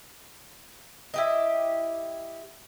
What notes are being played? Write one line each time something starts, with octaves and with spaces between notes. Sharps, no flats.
E4 G4 D#5